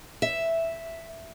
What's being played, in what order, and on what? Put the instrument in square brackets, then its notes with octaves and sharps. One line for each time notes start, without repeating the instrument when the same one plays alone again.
[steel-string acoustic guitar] E5